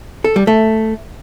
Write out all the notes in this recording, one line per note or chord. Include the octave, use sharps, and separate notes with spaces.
A4
G3
A3